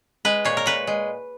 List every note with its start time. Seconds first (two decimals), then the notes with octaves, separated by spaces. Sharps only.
0.25 G#3 B4
0.45 A#2 C#5
0.57 A#4
0.66 A#2 B4
0.87 G#3